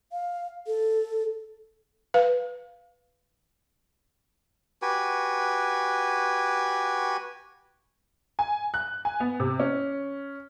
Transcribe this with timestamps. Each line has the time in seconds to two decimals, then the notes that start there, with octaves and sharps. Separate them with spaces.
0.12 F5
0.67 A4
2.14 B4 F5
4.82 F#4 G4 B4 G#5
8.39 G#5
8.74 F#6
9.05 G#5
9.20 B3
9.40 C3
9.60 C#4